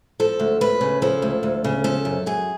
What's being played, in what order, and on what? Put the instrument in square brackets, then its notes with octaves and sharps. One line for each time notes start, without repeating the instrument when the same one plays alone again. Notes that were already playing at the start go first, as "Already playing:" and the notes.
[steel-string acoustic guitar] F3 A4
D2
D2 B4
C#3
F3 A4
D2
D2
C#3
F3 A4
F#2
F#2 G#4